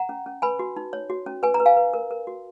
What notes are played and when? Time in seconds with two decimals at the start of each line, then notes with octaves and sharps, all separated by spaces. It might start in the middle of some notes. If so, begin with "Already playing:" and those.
Already playing: F#5 A#5
0.09 C#4
0.26 C#4
0.42 B4 G#5 B5
0.59 F#4
0.76 D#4
0.93 C#5
1.10 F#4
1.26 C#4
1.43 B4 G#5
1.54 A#5
1.60 B4
1.66 F5 G#5
1.77 B4
1.93 A#4
2.11 A#4
2.27 F#4